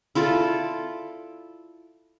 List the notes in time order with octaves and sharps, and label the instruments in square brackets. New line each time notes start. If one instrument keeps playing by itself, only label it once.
[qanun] E4 F4 A4 D5